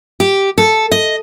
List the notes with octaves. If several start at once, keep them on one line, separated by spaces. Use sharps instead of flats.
G4
A4
D#5